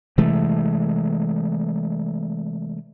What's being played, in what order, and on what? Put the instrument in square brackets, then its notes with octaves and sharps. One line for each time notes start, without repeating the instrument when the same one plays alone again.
[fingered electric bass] C3 E3 G#3 A3